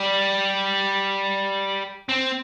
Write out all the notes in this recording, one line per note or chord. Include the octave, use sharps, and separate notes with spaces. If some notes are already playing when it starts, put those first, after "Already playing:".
Already playing: G3
C4